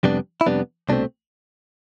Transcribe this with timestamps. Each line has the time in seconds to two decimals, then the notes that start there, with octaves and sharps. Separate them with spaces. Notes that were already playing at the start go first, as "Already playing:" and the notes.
0.03 F2 C3 G3 B3 D4
0.41 E4
0.46 F2 C3 G3 B3 D4
0.89 C2 B2 A3 C4 D4